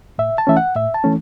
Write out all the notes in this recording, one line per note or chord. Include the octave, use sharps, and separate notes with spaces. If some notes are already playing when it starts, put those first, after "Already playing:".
A2 E5
A5
E3 A3 C#4 E5
F#5
A2 E5
A5
E3 A3 C#4